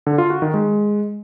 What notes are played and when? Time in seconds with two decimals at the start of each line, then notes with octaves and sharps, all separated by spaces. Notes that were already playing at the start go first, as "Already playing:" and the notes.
0.07 D3
0.18 F4
0.30 F#4
0.42 D#3
0.54 G#3